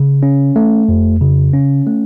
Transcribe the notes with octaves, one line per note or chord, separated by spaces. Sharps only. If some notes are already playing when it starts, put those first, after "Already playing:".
Already playing: C#3
C#4
A3
F2
C#3
C#4
A3